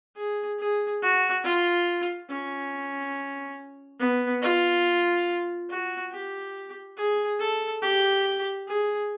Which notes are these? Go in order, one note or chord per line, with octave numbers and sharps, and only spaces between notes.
G#4
G#4
F#4
F4
C#4
B3
F4
F#4
G4
G#4
A4
G4
G#4